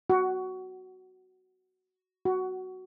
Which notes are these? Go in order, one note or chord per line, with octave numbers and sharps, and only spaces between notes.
F#4
F#4